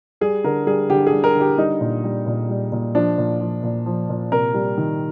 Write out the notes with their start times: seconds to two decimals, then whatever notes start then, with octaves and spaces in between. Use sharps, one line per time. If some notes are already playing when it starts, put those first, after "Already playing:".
0.21 G3 G#4
0.44 D3 A#4
0.67 G3 G#4
0.90 D3 G4
1.07 G#4
1.12 G3
1.24 A#4
1.35 D3
1.41 G4
1.58 G3 D#4
1.81 A#2
2.04 G3
2.26 A#2
2.49 G3
2.72 A#2
2.95 F3 D4
3.18 A#2
3.41 F3
3.63 A#2
3.86 F3
4.09 A#2
4.31 C3 A#4
4.54 G3
4.78 D#3